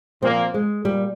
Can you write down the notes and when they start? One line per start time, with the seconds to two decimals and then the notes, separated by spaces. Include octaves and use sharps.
0.23 A#2 F3 A#3 C4
0.54 G#3
0.85 A#2 G3